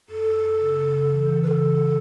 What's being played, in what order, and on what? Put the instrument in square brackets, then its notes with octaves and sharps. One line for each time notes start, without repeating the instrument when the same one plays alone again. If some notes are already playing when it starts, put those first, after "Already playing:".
[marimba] F#2 [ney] A4
[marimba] F#2
F#2
C#3
C#3
C#3
E3
E3
[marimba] C#3 [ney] A4 B4
[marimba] E3